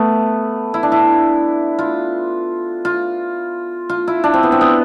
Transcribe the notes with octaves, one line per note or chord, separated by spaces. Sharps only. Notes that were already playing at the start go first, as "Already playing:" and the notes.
Already playing: A3 B3
E4
D4
E4
F4
F4
F4
E4
D4
C4
B3
C4
B3